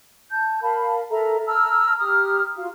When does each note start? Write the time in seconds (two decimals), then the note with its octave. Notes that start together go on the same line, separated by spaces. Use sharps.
0.31 A5 G6
0.62 A#4 F5 A5 B5
1.11 A4 A#4 E5 A#5
1.46 A5 A#5 E6 F6
1.99 G4 A#5 D#6 F6
2.56 F4 F#4 F5